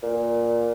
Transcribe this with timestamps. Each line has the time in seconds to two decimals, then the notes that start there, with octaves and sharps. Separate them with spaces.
0.03 A#2